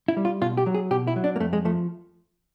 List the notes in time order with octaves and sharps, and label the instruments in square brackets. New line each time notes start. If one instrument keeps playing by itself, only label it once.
[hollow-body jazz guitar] E4
G3
F4
B2 F4
G4
F#3
G#4
B2 G4
E4
F#3
D4
A#3
F2 A3
G#3
F3 A3